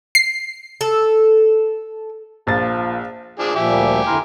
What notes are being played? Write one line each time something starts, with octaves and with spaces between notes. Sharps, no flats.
C7
A4
A#1 F3 A6
F3 D4 G#4
A#2 F3 G4 E5 G#5
D2 G3 A#3
F2 D3 E4 A#5 C6 F6